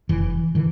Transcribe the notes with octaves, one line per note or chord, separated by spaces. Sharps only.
F1 E3
D3 E3